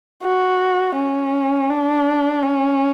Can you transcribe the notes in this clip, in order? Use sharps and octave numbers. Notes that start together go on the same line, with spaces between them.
F#4
C#4
D4
C#4